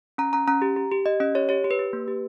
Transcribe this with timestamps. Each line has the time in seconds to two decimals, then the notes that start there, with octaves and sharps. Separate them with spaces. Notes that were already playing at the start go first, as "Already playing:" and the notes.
0.18 C#4 A#5
0.33 C#4 A#5
0.48 C#4 A#5
0.62 G4
0.76 G4
0.92 G4
1.06 G4 D#5
1.20 C#4 D#5
1.35 G4 C#5
1.49 G4 C#5
1.64 G4
1.71 B4
1.79 G4
1.93 A#3
2.08 G4